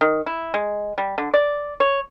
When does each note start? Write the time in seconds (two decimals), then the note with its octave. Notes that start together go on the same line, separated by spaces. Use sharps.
0.01 D#3
0.26 E4
0.54 G#3
0.98 G3
1.18 D3
1.34 D5
1.80 C#5